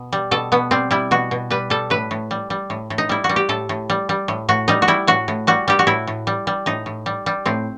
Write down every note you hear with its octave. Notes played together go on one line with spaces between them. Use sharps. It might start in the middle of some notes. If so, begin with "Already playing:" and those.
Already playing: B2
G3
B2 A4
B2 B3
G3 C4
G3 E4
B2 F#4
B2
G3 B4
G3 A4
A2 B4
A2
G3
G3
A2
A2
D#4
G3 E4
F#4
G3
G4
A2 A4
A2
G3
G3
A2
A2 F#4
G3 D#4
F#4
G3 E4
A2 F#4
A2
G3 F#4
G3 G4
F#4
A2 E4
A2
G3
G3
A2 D#4
A2
G3
G3
A2 C4